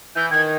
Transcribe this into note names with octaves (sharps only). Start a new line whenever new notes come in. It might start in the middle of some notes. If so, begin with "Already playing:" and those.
E3 G6
D#3 G#6